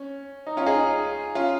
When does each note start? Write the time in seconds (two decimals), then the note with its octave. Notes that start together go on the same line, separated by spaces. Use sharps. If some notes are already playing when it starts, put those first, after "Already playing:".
Already playing: C#4
0.47 D#4
0.57 C#4 F4
0.66 D#4 G#4
1.35 C#4 F4